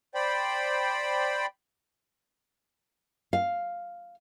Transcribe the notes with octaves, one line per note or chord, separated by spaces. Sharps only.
C5 D5 G5 B5
F5